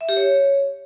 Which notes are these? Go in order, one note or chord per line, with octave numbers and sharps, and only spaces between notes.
E5
G4
C#5